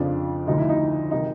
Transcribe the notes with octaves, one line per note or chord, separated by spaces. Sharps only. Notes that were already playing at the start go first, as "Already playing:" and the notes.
Already playing: F2 C#3 F3 D4
D2 D3 F3 D#4
E4
D#4
C3 D#3 G3 D#4